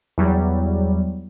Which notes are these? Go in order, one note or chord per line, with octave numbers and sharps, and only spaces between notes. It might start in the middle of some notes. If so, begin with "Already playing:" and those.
E2 F#3 G3